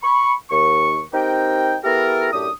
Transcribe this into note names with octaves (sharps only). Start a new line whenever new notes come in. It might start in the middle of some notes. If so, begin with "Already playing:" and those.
B5 C#6
D#2 C#6
C4 D#4 G4 A#4 G5
B3 E4 G4 A4 A#4
F#2 A2 D4 G4 D#6